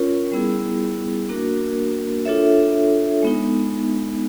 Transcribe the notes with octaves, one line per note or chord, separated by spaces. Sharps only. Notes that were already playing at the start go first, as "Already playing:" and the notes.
Already playing: C#4 F4 A#4 C#5
G3 B3 E4 G#4
A#3 D4 F#4 A#4
D4 F4 A4 C#5 E5
G#3 B3 D#4